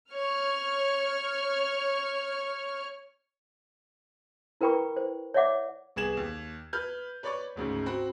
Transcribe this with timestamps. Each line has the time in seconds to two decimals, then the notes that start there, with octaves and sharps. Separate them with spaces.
0.12 C#5 F6
4.61 E4 A#4 B4 G5 B5 C#6
4.96 C5
5.34 C#5 D5 E5 F#5 D6
5.96 C2 B3 G#4 G#6 E7 F#7
6.17 D#2
6.73 B4 F6 G6
7.23 B4 C#5 D5 B5 C#6
7.56 G#1 D2 G#2 C#3
7.86 C4 F#4 B5 F#6